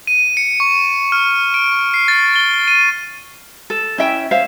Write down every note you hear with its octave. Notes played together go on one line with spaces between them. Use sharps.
D#7
C#7
C#6
F6
D7
C#6
C7
A6
G7
D#7
A4
C#4 E4 E5 G5
C5 C#5 E5 F5